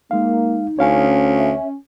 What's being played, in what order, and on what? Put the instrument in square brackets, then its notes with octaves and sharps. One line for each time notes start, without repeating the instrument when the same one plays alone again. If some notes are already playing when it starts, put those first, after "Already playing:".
[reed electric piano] G#3 F5 [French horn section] A#3 [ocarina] D#4
[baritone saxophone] D2 [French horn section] C#4 [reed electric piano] C#5 F5 G#5
[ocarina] E5